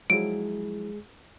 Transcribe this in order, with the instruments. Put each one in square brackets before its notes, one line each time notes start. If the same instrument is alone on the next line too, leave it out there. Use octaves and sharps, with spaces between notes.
[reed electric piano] F3 F#3 E4 [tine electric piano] G#3 G#4 [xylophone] D7